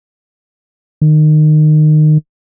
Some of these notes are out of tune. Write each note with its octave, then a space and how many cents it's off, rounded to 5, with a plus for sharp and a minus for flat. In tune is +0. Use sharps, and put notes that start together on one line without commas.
D#3 -25